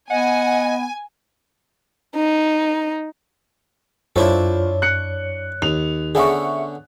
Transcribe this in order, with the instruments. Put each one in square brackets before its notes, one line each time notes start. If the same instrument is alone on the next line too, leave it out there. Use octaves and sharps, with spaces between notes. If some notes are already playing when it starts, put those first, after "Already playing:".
[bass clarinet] B3 [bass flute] D#5 [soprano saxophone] F#5 [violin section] G#5
[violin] D#4
[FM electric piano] F#2 C#5 [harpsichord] D4 E4 A4 [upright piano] F4 C5
[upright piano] F#6 C#7
[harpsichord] D#2 [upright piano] F7
[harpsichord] D3 B3 C#4 [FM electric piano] G#4 E5 C#6